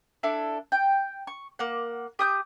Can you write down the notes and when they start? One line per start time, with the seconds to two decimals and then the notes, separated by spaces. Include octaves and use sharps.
0.23 D4 E4 A4
0.72 G5
1.27 C#6
1.59 A#3 F#5
2.19 G4 D#6 G6